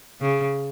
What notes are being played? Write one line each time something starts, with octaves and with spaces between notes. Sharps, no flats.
C#3